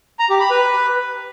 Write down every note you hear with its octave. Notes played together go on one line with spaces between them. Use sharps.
A#5
G4
B5
B4